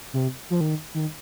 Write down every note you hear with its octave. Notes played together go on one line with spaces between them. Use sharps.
C3
F3
D#3
D#3